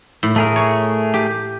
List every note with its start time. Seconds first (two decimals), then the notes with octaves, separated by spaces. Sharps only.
0.23 A2
0.36 A3 G#4 A#4
0.56 C#5
1.14 G4